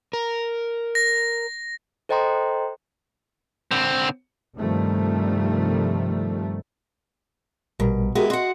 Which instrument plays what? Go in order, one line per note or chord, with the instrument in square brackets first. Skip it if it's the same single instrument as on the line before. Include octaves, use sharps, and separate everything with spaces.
[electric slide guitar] A#4
[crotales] A#6
[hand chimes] A4 C5 D#5 G5 A#5 C6
[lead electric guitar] D3 C4
[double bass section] G2 C3 D#3 F3 G3 A3
[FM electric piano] A#1 G3 A#4 [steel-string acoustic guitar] B2
[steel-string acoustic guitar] G#3 B3 E4 [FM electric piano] F#4 G4 A#4
[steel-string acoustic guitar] F#4 F#5 [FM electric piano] D#5 C6